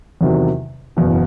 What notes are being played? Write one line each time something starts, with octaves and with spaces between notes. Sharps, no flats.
E2 C3 D#3 F#3
F#1 E2 B2